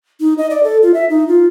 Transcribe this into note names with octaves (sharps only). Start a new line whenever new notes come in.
D#4
D#5
D5
A4
F4
E5
D#4
F4